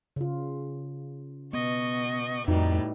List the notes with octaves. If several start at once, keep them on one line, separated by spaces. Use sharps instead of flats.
C#3 F4
B2 B3 D#5 C#6
F2 A2 E3 G3 D#4 F#4